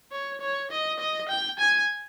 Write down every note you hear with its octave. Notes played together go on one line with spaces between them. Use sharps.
C#5
C#5
D#5
D#5
G5
G#5